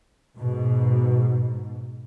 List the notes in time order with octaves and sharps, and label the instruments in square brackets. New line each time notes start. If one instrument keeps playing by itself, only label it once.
[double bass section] G#2 B2